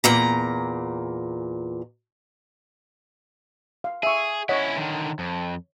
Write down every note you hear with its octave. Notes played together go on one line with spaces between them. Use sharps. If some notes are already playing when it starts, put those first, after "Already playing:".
E2 A#2 A#5
F5
G#4 E5 C#6
C#4 E4 C#5 D#5 F#5
D3 D#3
F2